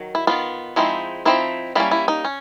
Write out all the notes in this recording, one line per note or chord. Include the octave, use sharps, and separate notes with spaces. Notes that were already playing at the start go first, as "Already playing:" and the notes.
Already playing: D#3 F#3
E4
D#3 F#3 B3 F4
F3 G#3 C4 D#4 E4
F3 G#3 C4 D#4 E4
G3 A#3 C#4 E4
E4
D#4
C#4